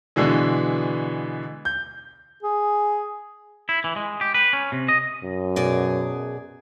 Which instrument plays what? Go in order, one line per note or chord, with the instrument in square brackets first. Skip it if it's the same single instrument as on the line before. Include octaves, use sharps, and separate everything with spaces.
[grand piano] B2 D3 E3 G#3
G6
[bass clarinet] G#4
[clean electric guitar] E4
E3
G#3
G4
B4
C#4
C3
D#5
[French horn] F#2
[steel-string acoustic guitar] B2 G#4 D5